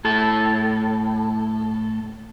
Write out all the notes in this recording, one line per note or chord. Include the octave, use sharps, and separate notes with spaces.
A2 A4